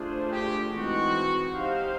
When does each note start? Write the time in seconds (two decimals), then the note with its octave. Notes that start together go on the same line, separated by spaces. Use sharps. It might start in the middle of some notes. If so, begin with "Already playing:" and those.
Already playing: A3 D4 F4 G#4 C5
0.32 G4
0.71 E3 G#3 C4 D#4 F#4
1.53 D#4 G4 C5 F5